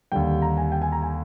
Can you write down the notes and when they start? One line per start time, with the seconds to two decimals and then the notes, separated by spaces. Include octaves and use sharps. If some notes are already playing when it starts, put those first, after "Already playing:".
0.12 D#2 D3 G3 G5
0.42 A#5
0.57 G#5
0.72 G5
0.82 G#5
0.92 A#5
1.02 G#5